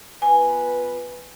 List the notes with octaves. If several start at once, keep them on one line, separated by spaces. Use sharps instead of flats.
B3 F4 B4 G#5